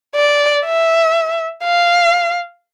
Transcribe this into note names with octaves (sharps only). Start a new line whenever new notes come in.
D5
E5
F5